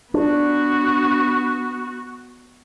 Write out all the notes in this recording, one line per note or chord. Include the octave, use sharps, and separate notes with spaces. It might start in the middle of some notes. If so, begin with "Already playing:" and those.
B3 D4 F#4